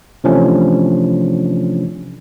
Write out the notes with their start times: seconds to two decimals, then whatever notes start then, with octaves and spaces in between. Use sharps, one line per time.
0.24 C3 E3 F3 A3 C#4 D4